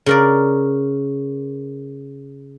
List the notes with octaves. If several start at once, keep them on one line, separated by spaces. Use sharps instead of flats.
C#3 A#4 D5